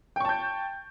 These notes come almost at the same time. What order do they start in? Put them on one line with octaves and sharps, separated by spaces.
G5 C#6 A5 G6